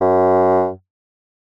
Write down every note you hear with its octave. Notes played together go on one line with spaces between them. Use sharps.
F#2